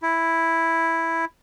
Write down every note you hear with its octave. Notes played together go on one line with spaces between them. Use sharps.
E4